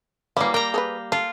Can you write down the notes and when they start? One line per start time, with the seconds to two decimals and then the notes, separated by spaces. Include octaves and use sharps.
0.37 E3 F#3 G3 A#3 E4
0.54 A#4 G5 A#5
0.74 G#4 A4 B4
1.12 F4 A4